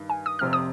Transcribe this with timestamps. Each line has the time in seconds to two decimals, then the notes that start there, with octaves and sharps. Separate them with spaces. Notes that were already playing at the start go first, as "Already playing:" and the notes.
Already playing: G2 D#3
0.10 G#5
0.26 D#6
0.39 F1 F2 C3 F6
0.53 D#6